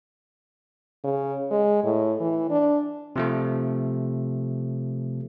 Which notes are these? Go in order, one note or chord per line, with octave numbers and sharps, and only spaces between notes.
C#3
G#3
A2
E3
D4
C3 F3 A3